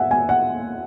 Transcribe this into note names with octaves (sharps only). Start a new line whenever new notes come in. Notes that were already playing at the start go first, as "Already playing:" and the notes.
Already playing: E5 F#5 G#5
G#5
F#5